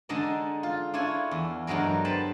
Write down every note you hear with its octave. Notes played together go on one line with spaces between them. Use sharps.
D3 G#3 D4 D#4 D#5 A5
F4
D4 E4 F4 C#5 G#5
E2
G2 D3 F#3 G#3 A#4
B4 C5 G5 A5 B5